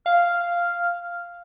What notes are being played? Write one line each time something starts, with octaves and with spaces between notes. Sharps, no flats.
F5 F6